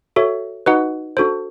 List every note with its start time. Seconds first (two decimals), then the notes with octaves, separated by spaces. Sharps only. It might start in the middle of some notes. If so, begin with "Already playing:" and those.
0.16 F#4 A4 C#5 E5
0.66 D#4 F#4 B4 D#5 F#5
1.17 D4 F#4 A4 C5